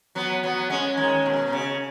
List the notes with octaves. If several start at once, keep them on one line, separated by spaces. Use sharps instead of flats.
F#3 B3
F#3 B3
G#3 C#4
D#3 G#3
B2
C#3